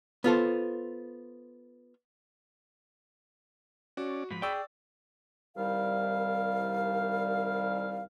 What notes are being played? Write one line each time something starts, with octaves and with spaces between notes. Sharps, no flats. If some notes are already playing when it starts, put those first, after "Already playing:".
B3 F4 A4 C5
C#4 F#4 D5
G#2 F3 B5
G#4 D5 G5 C#6 E6
C2 D#3 G3 F5